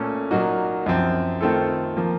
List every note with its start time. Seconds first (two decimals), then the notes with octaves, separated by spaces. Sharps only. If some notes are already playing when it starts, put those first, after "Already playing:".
Already playing: A#2 A3 C#4 A4
0.31 A#2 F#3 A#3 D#4 F#4
0.86 F#2 F3 C4
1.41 D#3 A3 C4 F4 A4
1.97 F3 A#3